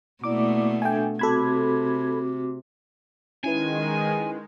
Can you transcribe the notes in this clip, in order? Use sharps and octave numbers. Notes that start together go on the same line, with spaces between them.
B2 A3 A#3 E4 D5 D6
D4 A4 E5 G5 G#5
C3 C4 F#4 A4 B5 D6 G#6
D#3 G#3 C#4 E4 B4 G#5